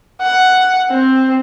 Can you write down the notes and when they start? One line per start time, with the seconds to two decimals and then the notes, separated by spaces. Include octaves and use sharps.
0.21 F#5
0.90 C4